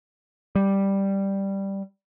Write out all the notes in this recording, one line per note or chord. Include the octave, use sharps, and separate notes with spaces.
G3